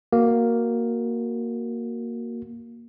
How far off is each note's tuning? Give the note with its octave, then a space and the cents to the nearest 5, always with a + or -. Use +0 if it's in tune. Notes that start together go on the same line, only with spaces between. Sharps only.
A#3 +0 F#4 +0